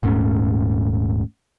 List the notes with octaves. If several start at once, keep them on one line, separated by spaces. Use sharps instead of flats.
D#1 G#2 A3 C#4